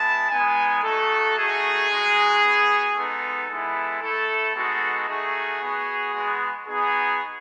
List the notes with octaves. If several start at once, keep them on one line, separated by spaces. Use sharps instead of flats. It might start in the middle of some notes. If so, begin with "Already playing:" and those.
Already playing: G#3 B3 E4 A5
G#3 B3 D#4 G#5
A3 D#4 F#4 A4
A3 D#4 F#4 G#4
G#3 D#4 F#4
B3 F#4
G#3 B3 D#4 A4
G#3 B3 E4
A3 E4 A4
G#3 B3 D#4 F#4 A4
A3 D#4 F#4 G#4
B3 F#4
G#3 B3 F#4
B3 D#4 F#4 G#4